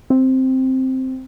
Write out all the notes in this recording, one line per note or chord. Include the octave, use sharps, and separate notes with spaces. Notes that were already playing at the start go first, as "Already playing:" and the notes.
C4